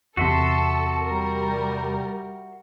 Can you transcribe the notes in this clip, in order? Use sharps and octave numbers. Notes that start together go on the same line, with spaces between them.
E2 C3 F#4 A4 E5 C6
G3 A#4